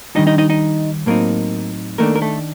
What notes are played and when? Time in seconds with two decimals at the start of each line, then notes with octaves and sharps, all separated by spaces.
0.15 D#3 G3 D4 D#4 D#5
0.27 D#4 D#5
0.38 D#4 D#5
0.50 D#4 D#5
1.06 A2 F#3 A#3 C4 D#4 A#4
1.98 D#3 A3 A#3 D4 A#4
2.16 A#4
2.22 A3 A4